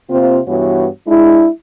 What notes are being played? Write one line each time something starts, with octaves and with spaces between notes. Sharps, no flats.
C3 A#3 C4 F4 C5
G2 E3 B3 F#4 C#5
G#3 D4 E4